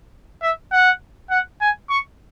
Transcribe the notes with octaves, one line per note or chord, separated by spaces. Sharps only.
E5
F#5
F#5
G#5
C#6